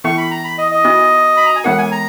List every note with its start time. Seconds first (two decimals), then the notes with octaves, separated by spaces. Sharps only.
0.04 E3 B3 E4 C#6
0.18 B5
0.31 A#5
0.44 B5
0.58 D#5
0.72 D#5
0.85 B3 D#4 F#4
1.37 B5
1.46 A#5
1.56 G#5
1.64 E3 G#3 B3 D#4 A#4 F#5
1.78 G#5
1.92 A#5